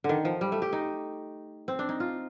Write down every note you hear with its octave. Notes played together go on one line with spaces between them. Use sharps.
D3
D#3
F3
G3
A3
G4
D#4
C4
D4
D#4
F4